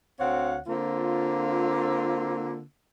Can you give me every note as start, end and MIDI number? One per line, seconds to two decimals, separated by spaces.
0.19 0.57 38
0.19 0.57 60
0.19 0.57 73
0.19 0.57 77
0.19 0.57 78
0.67 2.61 50
0.67 2.61 58
0.67 2.61 60
0.67 2.61 65